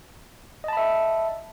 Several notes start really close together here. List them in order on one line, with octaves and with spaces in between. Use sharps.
D#5 A5 B5 E5